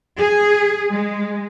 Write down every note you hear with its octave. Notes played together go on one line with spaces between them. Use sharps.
G#4
G#3